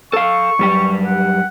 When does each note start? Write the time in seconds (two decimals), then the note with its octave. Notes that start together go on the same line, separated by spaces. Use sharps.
0.13 A4 F5 C#6
0.59 F#2 G3 G4
1.06 F#5